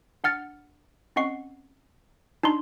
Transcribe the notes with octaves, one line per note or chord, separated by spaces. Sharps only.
D4 F#5 F6 A6 C#7
C4 C#4 D#5 F#5 C#6 C7
D4 D#4 A#5 C6